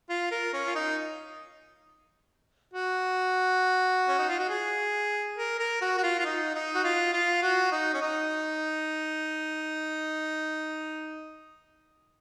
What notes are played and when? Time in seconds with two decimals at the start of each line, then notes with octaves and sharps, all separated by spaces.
0.09 F4
0.31 A#4
0.53 C#4
0.67 F4
0.75 D#4
2.74 F#4
4.08 C#4
4.18 D#4
4.29 F4
4.39 F#4
4.49 G#4
5.37 A#4
5.59 A#4
5.81 F#4
5.98 F#4
6.03 F4
6.19 F4
6.25 D#4
6.55 D#4
6.75 F#4
6.84 F4
7.13 F4
7.42 F#4
7.72 D#4
7.94 C#4
8.01 D#4